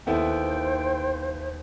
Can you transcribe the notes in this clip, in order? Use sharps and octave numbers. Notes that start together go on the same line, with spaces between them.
D#2 A3 B3 E4 C5 G5